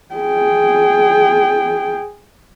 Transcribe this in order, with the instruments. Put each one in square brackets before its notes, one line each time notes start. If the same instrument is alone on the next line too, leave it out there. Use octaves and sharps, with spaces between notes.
[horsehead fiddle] G#4 G5